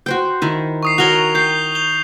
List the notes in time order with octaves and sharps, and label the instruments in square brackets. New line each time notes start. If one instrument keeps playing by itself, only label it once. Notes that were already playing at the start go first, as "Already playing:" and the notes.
[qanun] F#4 C5 G5
D#3 E4
[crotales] C#6 D#6 C7
[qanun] F#4 A#4 C#5 [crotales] F7 G7
[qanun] G5 [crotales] G6 C7
[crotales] F7 G7